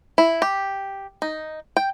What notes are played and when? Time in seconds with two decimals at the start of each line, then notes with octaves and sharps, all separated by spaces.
0.18 E4
0.42 G4
1.22 D#4
1.77 G5